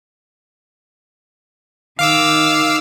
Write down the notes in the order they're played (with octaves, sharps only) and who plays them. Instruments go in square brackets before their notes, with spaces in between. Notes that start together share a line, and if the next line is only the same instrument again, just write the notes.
[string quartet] D#3 [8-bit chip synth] F5 D6 E6